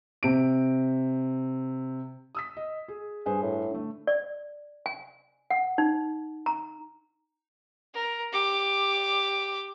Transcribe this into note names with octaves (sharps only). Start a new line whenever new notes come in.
C3 D7
D#6 E6 B6
D#5
G#4
G2 G#4 B4 C5
A2
D3 A3
D5
G#5
F#5
D#4
A#5
A#4
G4 D6